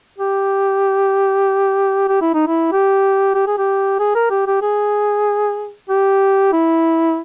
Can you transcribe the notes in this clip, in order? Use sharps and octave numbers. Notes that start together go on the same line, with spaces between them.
G4
G4
E4
D#4
E4
G4
G4
G#4
G4
G#4
A#4
G4
G4
G#4
G4
E4